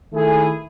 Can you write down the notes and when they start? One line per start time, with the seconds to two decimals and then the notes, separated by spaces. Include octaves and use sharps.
0.11 D#3 A3 E4 G#4